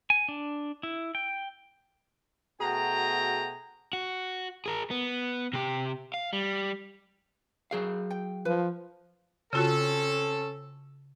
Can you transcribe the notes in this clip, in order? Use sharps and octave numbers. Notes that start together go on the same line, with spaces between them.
G#5
D4
E4
G5
B2 A3 F#4 G#4 G5 A#5
F#4
G#4 A#4
B3
C3 G4
F5
G3
F#3 G#4 F5
G5
F3 B4
C#3 C4 C#4 F4 F#4 A4